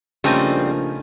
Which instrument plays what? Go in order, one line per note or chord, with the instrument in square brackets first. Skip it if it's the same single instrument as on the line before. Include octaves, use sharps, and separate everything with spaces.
[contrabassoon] A#1 [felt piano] C#3 C#4 [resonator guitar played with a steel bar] G3 C4 [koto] A3 D#4 D#5